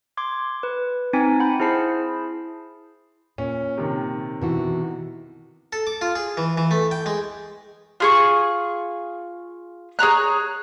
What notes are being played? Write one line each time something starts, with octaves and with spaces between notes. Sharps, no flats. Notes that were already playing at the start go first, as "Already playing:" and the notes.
C6 D6 G#6
B4
C4 D#4 G#5 B6
F#5 G5 B5 G6
E4 G#4 C5 A5 C7
A#2 C#4
C3 D#3
B2 E3 F#4
A4
D6
F4
G#4
E3
E3
A3
G5
G#3
F4 G#4 C#6
G#4 C#5 A#5 F#6